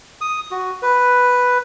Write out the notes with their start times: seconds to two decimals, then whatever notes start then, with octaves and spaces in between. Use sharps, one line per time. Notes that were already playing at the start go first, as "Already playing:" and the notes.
0.21 D#6
0.51 F#4
0.82 B4